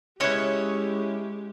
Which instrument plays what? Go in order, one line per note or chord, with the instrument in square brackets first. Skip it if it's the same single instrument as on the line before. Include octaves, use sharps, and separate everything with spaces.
[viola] G#3 G4 [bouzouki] C#4 B4 [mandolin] E4 C#5 D#5